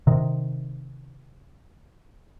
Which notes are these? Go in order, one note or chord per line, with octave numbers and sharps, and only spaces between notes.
C3 D#3